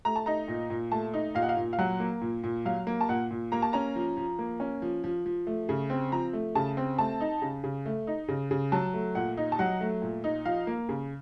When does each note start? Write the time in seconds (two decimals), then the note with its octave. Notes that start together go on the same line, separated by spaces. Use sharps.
0.05 A3 A#5
0.16 A5
0.26 D#4 A#5
0.48 A#2
0.70 A#2
0.91 A3 A5
1.14 D#4
1.35 A#2 F5
1.42 F#5
1.49 F5
1.57 A#2
1.73 F5
1.79 F#3 F#5
2.00 A#3
2.22 A#2
2.44 A#2
2.65 F#3 F5
2.87 A#3
3.01 A5
3.09 A#2 F#5
3.31 A#2
3.52 A#3 A#5
3.62 A5
3.73 C#4 A#5
3.96 F3
4.17 F3
4.39 A#3
4.60 C#4
4.82 F3
5.04 F3
5.26 F3
5.47 A3
5.69 C#3
5.90 C4
6.12 F3 A#5
6.33 A3
6.55 C#3 A5
6.77 C4
6.98 A3 A5
7.20 D#4
7.42 C#3
7.64 C#3
7.86 A3
8.07 D#4
8.28 C#3
8.51 C#3
8.72 F#3 A5
8.94 A3
9.15 A#2 F#5
9.37 D#4
9.52 A5
9.59 F#3 F#5
9.81 A3
10.02 A#2
10.24 D#4
10.45 F3 F5
10.67 A#3
10.89 C#3